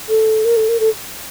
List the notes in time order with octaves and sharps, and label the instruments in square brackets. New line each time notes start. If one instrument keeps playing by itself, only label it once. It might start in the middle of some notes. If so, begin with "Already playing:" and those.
[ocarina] A4
A#4
A4
A#4
A4